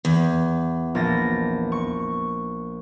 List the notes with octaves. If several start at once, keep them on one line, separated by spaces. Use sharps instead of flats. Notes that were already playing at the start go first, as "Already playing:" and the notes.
E2
A#1 A6 A#6
C#6